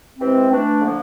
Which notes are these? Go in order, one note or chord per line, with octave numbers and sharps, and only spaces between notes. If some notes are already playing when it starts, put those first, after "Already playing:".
C3 E3 G#3 C4
E3 A3 D4
D3 F3 A#3